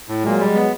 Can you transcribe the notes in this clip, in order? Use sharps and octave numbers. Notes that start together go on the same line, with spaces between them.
A2
A#2 F#3 G#3
G3
B3